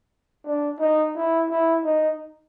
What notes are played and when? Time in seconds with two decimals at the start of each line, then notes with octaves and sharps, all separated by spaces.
0.45 D4
0.79 D#4
1.15 E4
1.49 E4
1.84 D#4